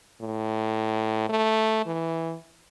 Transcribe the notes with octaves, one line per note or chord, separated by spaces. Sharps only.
A2
A3
E3